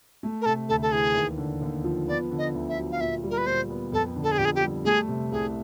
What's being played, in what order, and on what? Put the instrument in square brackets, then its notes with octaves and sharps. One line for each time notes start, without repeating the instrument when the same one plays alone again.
[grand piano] A3
[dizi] A#4
[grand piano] C3 [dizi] A4
[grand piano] D2 [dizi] A4
[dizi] A4
[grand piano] E3 [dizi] G#4
[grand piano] D#2
D3
D#2
F3
[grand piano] B3 [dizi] D5
[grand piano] D3
[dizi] D#5
[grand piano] D2
[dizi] E5
[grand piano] F#3
[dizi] F5
[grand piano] A#2 [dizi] E5
[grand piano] G3
[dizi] A#4
B4
[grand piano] A#2 [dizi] C5
[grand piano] B3
[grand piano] F2 [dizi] A4
[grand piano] D3
[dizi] A4
G#4
[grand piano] F2 [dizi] G4
[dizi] G#4
G4
[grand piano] G3
[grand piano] A3 [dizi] G#4
[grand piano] C3
[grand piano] C2 [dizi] G#4